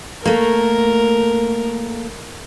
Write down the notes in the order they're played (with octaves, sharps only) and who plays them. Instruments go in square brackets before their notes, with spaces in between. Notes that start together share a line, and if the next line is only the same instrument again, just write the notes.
[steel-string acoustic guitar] A3 A#3 [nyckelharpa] A#4